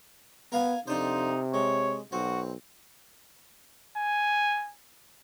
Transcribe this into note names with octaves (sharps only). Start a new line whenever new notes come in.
B3 A#4 F5 G#5
F2 C3 D4 D#4 C5
G#3 C#5
B1 C4 F#4
G#5